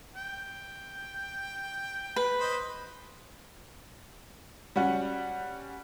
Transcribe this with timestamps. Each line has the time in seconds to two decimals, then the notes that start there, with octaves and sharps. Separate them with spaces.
0.15 G5
2.16 B4
2.40 C5 D#5 B5
4.76 G3 C#4 F#4